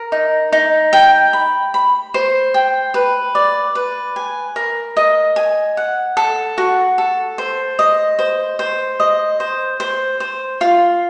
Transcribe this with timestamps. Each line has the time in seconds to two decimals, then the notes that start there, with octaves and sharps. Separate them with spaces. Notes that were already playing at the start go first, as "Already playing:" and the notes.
Already playing: A#4
0.12 D#4
0.52 D#4
0.93 G5
1.33 B5
1.74 B5
2.14 C5
2.54 G5
2.94 B4
3.35 D5
3.75 B4
4.16 G#5
4.56 A#4
4.97 D#5
5.36 G#5
5.77 F#5
6.17 A4
6.58 F#4
6.98 A4
7.38 C5
7.79 D#5
8.19 C5
8.59 C5
9.00 D#5
9.40 C5
9.80 C5
10.20 C5
10.61 F4